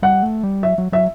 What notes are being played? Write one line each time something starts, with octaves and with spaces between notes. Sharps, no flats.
G3 F#5
A3
G3
F#3 E5
F#3
F#3 E5